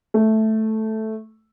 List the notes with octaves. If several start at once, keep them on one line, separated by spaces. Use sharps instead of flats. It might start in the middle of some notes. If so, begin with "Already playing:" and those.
A3